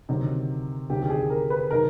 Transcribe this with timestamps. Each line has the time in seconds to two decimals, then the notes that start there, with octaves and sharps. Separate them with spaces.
0.09 D2 C3 D#3 F#3
0.90 D2 C3 D#3 F#3 G4
1.03 G4
1.10 G#4
1.30 A#4
1.50 B4
1.71 C3 D#3 F#3 A#4